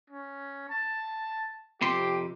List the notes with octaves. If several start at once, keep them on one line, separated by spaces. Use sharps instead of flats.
C#4
A5
F2 C3 G4 C6